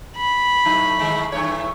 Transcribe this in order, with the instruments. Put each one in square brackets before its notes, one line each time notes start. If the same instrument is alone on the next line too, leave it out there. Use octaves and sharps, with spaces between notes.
[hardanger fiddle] B5
[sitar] A2 F#3 D#4
A2 D#3 G#3
G2 E3 C#5